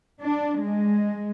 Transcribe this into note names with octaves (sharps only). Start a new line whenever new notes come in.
D4
G#3